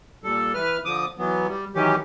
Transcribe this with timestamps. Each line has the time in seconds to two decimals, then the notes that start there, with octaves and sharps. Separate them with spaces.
0.24 A#2 G3 A4
0.54 E3 B4 F6
0.85 D3 F3 D6 D#6
1.18 E3 F#3 B3
1.48 G3
1.75 D#3 E3 F#3 C#4 G4